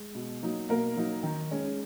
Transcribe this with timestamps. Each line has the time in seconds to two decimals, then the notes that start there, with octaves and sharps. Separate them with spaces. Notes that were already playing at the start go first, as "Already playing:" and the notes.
Already playing: G#3
0.15 B2
0.43 F#3 A#3 D#4
0.69 B2 A#3 A#4
0.97 F#3 A#3 D#4
1.23 D#3
1.51 G#3 C#4